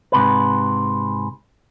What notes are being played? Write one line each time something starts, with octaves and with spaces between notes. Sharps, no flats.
G#2 C3 B4